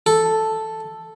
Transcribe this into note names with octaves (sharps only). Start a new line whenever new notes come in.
A4